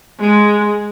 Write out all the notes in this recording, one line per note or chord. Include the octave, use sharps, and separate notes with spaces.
G#3